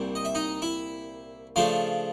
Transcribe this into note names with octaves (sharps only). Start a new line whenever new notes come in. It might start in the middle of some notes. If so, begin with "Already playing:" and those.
Already playing: C2 A#2 G3
D#5
E5
D#4 D#5
E4 E5
C#3 F3 A3 D4 F4 F5